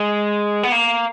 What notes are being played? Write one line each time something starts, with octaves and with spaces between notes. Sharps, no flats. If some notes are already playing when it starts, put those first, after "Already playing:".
Already playing: G#3
B3
A#3